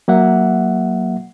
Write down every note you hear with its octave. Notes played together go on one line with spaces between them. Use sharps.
F#3 A#3 E5 F#5